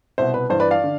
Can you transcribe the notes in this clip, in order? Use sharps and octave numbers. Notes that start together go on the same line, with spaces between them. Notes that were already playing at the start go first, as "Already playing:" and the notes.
C2 B2 C5 E5
B4
G2 E3 C5
B4 D5
D5 F5
D3